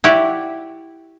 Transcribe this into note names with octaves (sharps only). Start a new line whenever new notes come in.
E4 F#4 G4 D5